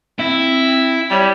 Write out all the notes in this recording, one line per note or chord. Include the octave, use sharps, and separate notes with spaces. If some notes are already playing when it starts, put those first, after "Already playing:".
C4 E4
G3 C#5